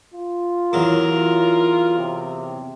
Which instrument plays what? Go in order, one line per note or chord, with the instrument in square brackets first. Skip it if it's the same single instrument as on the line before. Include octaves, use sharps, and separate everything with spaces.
[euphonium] F4
[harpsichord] E2 F#3 [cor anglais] A#4
[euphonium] F4
C3